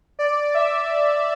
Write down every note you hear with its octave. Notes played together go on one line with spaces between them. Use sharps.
D5
E5